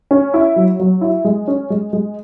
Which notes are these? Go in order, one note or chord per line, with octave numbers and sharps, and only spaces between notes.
C#4
E4
F#3
F#3
E4
G#3
C#4
G#3
G#3